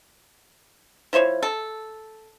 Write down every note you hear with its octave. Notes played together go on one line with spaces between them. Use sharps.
F3 E4 C5 C#5
A4